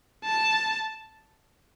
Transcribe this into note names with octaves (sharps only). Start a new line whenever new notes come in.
A5